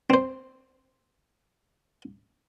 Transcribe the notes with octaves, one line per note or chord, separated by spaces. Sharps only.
C4 C5